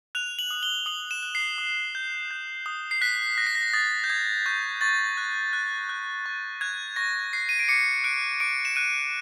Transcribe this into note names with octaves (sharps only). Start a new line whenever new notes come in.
F#6 F7
F#7
D#6
G7
D#6 F#7
E7
F#6
C7
D#6
G6
G6
D#6
C7
F#6 B6
F#6 A#6
B6
A#6
D#6 A6
G6
D#6 G#6
C#6 G6
C#6 A6
F#6
F#6
F#6
C#6
F#6 G#6
C#6 A#6
F#6 C7
D#7
D7
D6 C#7
F#6 D7
D6 D7
E7
F#6 D#7